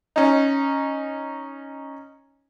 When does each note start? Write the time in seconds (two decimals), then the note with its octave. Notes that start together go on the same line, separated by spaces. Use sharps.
0.16 C#4 D#4